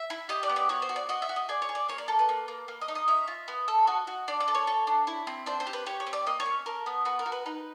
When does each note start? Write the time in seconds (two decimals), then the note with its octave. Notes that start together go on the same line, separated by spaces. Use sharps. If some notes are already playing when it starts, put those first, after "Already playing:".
Already playing: E5
0.10 E4
0.29 G4 D#5
0.43 D5
0.49 B3
0.56 D5
0.69 F#4 C#5
0.82 C5
0.89 F#4
0.96 D5
1.09 F#4 D#5
1.22 E5
1.29 F#4
1.36 D#5
1.49 G#4 D5
1.62 C#5
1.69 G#4
1.75 D5
1.89 A#3 C#5
1.98 D5
2.08 A4 A#4
2.19 B4
2.29 A#3
2.48 A#3
2.68 A#3
2.81 D#5
2.88 D#4
2.95 D#5
3.08 C#4 E5
3.28 F4
3.48 B3
3.68 A4
3.87 F#4 D#5
4.07 F#4
4.28 D4 D5
4.40 D5
4.48 A4
4.55 C#5
4.67 A4
4.87 D4
5.07 E4
5.27 C4
5.46 D4 C5
5.60 C5
5.67 G4
5.73 B4
5.86 G4 C#5
6.00 C#5
6.07 C4
6.13 D5
6.27 A#3 D#5
6.40 C#5
6.46 C#4
6.66 A4 A#4
6.86 B3
7.05 F#4 B4
7.19 A#4
7.26 F#4
7.32 B4
7.46 D#4 B4